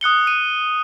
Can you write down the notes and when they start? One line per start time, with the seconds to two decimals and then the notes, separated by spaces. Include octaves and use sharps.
0.01 D#6 F#6 C#7 G7
0.27 D#7